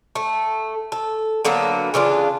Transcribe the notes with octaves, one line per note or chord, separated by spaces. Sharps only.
A3
A4
D3 F#3 A#3 B3
C#3 E3 D4 F4